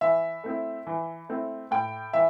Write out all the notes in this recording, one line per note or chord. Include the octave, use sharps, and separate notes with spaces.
E3 E5
A3 C4 E4
E3
A3 C4 E4
A2 G5
E3 E5